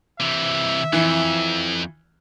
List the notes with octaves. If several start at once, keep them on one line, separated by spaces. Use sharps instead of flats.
C3 E3 E5
F2 E3